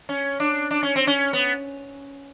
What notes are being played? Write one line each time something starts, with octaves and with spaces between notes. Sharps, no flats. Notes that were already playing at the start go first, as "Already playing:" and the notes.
C#4
D4
D4
C#4
C4
C#4
B3